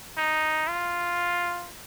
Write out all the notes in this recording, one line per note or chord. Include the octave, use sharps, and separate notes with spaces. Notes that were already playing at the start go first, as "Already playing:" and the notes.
D#4
F4